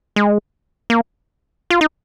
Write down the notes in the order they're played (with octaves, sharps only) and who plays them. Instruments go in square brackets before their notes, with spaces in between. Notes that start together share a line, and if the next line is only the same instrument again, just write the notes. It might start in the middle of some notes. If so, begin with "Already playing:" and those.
[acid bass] G#3
A#3
F4
D#4